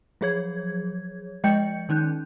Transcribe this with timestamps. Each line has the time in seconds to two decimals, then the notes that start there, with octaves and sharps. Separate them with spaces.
0.21 F3 F#3 G#4 C#5 G#6
1.44 F3 G#3 D#5 G5 G6 C#7
1.89 D#3 C#4 D#4 F#6 G6